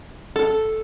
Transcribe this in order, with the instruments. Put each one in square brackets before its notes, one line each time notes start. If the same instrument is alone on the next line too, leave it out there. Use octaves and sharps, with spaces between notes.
[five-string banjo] A4